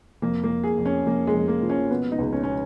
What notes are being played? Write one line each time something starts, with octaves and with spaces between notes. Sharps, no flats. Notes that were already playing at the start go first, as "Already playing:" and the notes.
F2 A#3
A#3
F2
G#4
F2
C#4
F2 A#3
G#3
F2
A#3
F3
C#4
B2 B3
D#4
C#2
C#4
B2 C#4